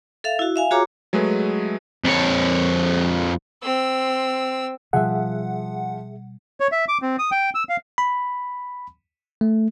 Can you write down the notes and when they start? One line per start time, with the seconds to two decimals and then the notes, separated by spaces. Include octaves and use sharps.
0.24 A4 E5 F5
0.39 E4 F#4
0.56 E5 F5 G#5
0.71 F4 F#4 G#4 C#5 A#5 D6
1.13 F#3 G#3 A3 G#4 B4
2.05 F2 C#5
3.63 C4 E6
4.93 B2 F3 G3 G#4 E5 F#5
6.60 C#5
6.72 E5
6.88 D6
7.02 C4
7.19 D#6
7.31 G5
7.55 E6
7.69 F5
7.98 B5
9.41 A3